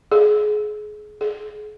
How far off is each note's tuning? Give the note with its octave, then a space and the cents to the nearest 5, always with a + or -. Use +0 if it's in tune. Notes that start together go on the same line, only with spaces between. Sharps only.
G#4 +25
G#4 +35